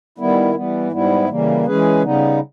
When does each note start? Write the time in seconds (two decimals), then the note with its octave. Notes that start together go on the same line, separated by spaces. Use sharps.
0.18 D#3 G3 B3 E4
0.55 E3 G3 B3
0.91 G#2 G3 B3 E4
1.29 C#3 E3 G3 A#3
1.66 E3 G#3 C#4 G#4 B4
2.03 C#3 G3 B3 D#4